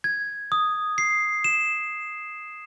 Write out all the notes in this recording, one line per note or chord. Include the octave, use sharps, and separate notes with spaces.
G#6
D#6
C7
E7